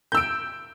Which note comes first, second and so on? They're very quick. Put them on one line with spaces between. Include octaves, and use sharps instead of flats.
G6 E6 D7